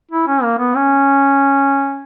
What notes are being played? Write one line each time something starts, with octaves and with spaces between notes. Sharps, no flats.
E4
C#4
A#3
B3
C#4